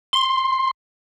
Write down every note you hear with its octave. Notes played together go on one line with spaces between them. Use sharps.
C6